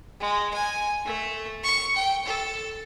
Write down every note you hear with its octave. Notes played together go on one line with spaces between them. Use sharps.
G#3
G#5
A3
C#6
G5
A4